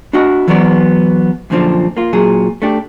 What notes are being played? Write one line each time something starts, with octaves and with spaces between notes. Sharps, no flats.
D4 E4 F#4 D#5 F#5
E3 F#3 B3 C4 C#5 D5
F#2 A#2 D3 F3 C4 D4
A#3 F4
A#2 F#3 G#4
A3 D4 G4